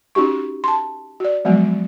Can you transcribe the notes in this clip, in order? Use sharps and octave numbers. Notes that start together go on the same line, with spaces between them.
C#4 D#4 F#4 G4 C#6
A5 C6
F#4 D5
F3 F#3 G#3 B3 F#4